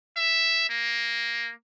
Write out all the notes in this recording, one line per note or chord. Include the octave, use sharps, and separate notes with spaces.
E5
A#3